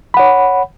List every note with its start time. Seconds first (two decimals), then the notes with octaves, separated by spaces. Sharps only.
0.14 B5
0.17 F#5
0.19 C#5